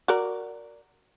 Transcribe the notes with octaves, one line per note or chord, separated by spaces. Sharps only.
F#4 A#4 D5